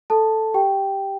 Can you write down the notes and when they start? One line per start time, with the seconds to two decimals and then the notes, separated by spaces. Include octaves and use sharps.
0.10 A4 A5
0.54 G4 G5